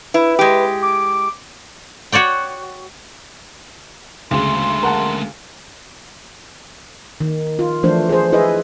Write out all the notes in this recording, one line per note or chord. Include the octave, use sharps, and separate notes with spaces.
E4 B4
G#3 G4
D6
F#4 C#5 D5 G5
D2 C#3 G#3 A3 C6
A#4 F#5 A5
D#3
F4
E3 F3 A3 D4 C5
G#4 C5
E4 G#4 B4 D#5